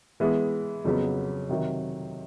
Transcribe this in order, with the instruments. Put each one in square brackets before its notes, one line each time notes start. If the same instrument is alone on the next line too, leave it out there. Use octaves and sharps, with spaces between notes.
[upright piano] E3 G#3 B3
F2 C#3 F#3 B3
C3 D#3 F#3